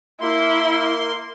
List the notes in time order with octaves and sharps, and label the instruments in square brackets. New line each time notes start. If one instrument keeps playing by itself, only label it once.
[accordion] A#3 C6 [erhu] E4